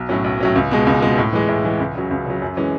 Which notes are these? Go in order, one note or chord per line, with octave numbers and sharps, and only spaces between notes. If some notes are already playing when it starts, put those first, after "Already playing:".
Already playing: B1
A2 F#3 C#4
B1
A2 F#3 C#4
C#2
B2 G#3
C#2
B2 G#3
A2
E3 G#3
A2
E3 G#3
C#2
C#3 F#3
C#2
C#3 F#3
F#2
E3 G#3 C#4